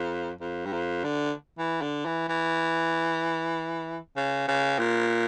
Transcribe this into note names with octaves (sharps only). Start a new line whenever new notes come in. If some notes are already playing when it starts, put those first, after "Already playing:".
Already playing: F2
F2
G2
F2
D3
E3
D3
E3
E3
C#3
C#3
A#2